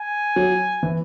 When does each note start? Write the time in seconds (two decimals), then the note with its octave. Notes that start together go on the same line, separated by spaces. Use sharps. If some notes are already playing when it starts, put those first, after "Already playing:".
Already playing: G#5
0.36 F#3
0.83 E3